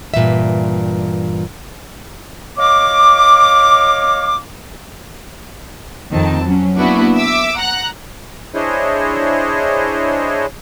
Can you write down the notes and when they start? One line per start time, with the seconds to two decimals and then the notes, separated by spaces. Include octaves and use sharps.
0.14 G2 A#2 E3 E5
2.58 C#5 D#5 F5 D6
6.12 F2 D#3 C4 A5
6.46 F#3 C#4
6.76 A#3 B3 D4 E4 F#4 B4
7.18 E5 D6 E6
7.57 F#5 A#5 F#6
8.54 D4 E4 G#4 C5 C#5 D#5